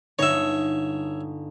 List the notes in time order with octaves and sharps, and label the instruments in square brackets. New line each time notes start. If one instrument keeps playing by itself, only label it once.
[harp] G1 D#4 [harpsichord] C#5 E5